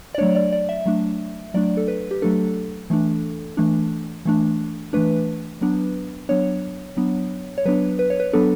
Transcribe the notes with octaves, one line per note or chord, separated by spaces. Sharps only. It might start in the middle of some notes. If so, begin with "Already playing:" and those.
D5
F#3 A3 D4 C#5
D5
D5
E5
F#3 A3 D4
F#3 A3 D4 D5
A4
B4
G4
F#3 A3 D4 A4
E3 A3 D4
E3 A3 D4
E3 A3 D4
E3 A3 D4 B4
F#3 B3 D4
F#3 B3 D4 C#5
F#3 B3 D4
C#5
F#3 B3 D4 B4
B4
C#5
B4
F#3 B3 D4 A4